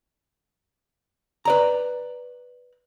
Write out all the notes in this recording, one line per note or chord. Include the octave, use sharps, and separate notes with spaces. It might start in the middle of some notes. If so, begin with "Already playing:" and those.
B4 D5 A#5